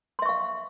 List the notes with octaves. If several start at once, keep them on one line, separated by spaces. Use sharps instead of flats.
E5 F5 C6 C#6